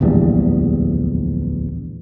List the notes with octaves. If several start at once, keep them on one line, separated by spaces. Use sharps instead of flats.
D1 A#1 E2 G3